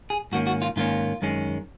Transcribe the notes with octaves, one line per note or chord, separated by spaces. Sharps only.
G#4
G#2 D#3 A#3 C#4 F#4
F#4
F4
G#2 D#3 A#3 C#4 F4
F#2 D#3 G#3 C#4